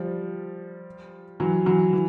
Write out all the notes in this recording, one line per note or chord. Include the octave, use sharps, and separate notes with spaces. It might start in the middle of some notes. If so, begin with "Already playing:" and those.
Already playing: F3 G3
E3 F#3
E3 F#3
E3